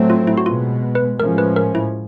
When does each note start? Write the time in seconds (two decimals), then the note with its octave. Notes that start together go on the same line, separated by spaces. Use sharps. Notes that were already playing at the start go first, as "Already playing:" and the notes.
Already playing: A2 F#3 A3 C4
0.10 F4
0.27 E4
0.38 F#4
0.46 B2 G#3 B3 F4
0.95 B4
1.19 A2 F3 G#3 C#4 A#4
1.38 B4
1.56 A#4
1.75 E4